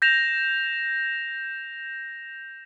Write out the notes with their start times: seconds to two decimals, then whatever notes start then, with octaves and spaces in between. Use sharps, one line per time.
0.02 G6 A#6 E7 F7